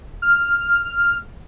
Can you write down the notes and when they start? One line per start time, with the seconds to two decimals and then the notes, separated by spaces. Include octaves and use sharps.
0.22 F6